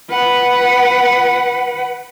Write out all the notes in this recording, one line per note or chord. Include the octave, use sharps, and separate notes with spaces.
B4 F#5